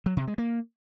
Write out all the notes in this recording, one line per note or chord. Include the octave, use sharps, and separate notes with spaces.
F#3
C3
G#3
A#3